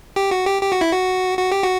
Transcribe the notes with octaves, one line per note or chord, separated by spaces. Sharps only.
G4
F#4
G4
G4
F#4
E4
F#4
F#4
G4
F#4